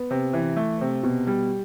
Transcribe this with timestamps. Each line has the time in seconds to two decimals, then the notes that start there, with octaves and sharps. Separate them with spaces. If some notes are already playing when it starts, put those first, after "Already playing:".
Already playing: B3
0.11 C3
0.33 E3
0.57 A3
0.81 C3
1.03 B2
1.27 G3